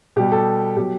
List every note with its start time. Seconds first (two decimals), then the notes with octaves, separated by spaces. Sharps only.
0.16 B2 G3 G4
0.32 A4
0.77 B2 F#3 G4